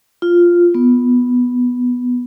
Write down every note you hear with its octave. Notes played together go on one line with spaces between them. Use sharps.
F4
B3